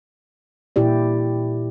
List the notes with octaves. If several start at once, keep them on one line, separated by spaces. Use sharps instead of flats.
A#2 E4 G4 D5